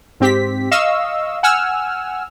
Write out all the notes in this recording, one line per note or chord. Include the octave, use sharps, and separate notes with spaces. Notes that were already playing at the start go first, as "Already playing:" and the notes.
G#2 C4 G4 B6
D#5 F5 C#6 E6
F#5 G#5 E6 F6